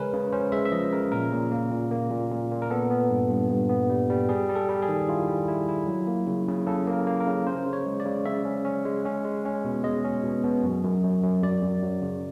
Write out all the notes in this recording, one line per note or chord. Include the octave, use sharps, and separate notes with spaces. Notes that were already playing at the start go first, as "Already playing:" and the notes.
Already playing: C#3 G#3 C#4 A#4 B4
C#3
C#4 C5
G#3 E5
E5
F3 D#5
C#3 A#4
A#2 A#4
A#2
A#3
A#2
A#3
A#2
A#2
A#2
A#4
B3 A4
B3
G2
G2
G2
B3
G3
G3
G3 G#4
G3
A4
G3
G#4
D#3
E4 F4
G3
E4
E4
F#3
A#3
C#3
C#3
C#3 A4
A#3
A#4
A#3
A#4
C#3
C#4 C5
C#3
C#5
G#3
D5
C#3
C#3 E5
C#4
C#4
G#3
C#4
G#3
C#4
B2
G#3 D#5
C#4
B2
B2
F#2
F#2
F#2
F#2
F#2 D5
F#2
F#3
C#3